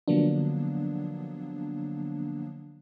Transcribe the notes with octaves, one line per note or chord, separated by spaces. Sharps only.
D3 F3 F#3 A#3 B3 D4